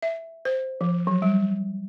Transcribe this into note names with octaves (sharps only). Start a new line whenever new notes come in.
E5
C5
F3
F#3
G3